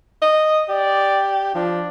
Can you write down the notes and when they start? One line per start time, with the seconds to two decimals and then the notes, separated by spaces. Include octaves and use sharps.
0.22 D#5
0.69 G4 D5
1.55 F3 D4